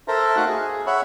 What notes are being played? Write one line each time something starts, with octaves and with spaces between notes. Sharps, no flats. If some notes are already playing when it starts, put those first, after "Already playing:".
A4 A#4 C5 E5 A5 A#5
A3 D#4 F#4 F5 F#6
G#4
C#5 E5 F#5 B5